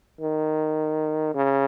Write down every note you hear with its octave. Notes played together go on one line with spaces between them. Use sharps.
D#3
C#3